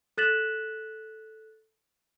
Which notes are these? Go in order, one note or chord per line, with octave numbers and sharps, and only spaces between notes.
A4 F#6 A6 B6 E7 F#7